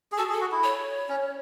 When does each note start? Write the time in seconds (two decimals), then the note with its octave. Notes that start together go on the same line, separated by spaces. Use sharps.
0.12 G#4
0.18 F#4 A4
0.29 G#4
0.33 A4
0.41 F#4
0.52 E4
0.63 C#5
1.09 C#4